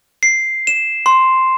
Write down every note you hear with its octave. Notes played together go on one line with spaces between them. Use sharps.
C7
E7
C6